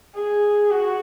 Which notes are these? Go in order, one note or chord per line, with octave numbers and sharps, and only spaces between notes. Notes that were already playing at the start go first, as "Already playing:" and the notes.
G#4
F#4